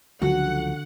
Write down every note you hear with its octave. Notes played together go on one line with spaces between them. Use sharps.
C#2 D3 F3 F#3 F#4 F#5